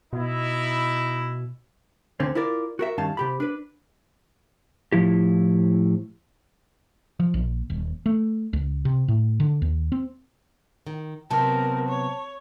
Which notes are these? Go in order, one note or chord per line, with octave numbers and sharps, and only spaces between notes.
B2 D#4 E4
D2 D3 C4 C#4
E4 F4 A#4 D5
F#4 A#4 E5
G2 D#3 C#4 D#4 F5 A5
C3 G4 B5
D4 B4
A2 F3 E4 G4
F3
A#1
D#1
A3
C#2
C3
A2
D3
D#2
C4
D#3
C3 F#3 B3 C4 A#4 A5
C#5